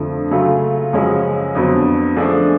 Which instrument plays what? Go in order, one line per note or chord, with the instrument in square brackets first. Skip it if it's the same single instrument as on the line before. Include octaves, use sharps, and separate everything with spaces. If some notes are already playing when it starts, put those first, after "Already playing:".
Already playing: [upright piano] F2 D3 F3 A3
C#3 F#3 A3 F4
F#2 C#3 F3 G#3 C#4
F2 D3 F#3 B3
F3 A3 D4 G#4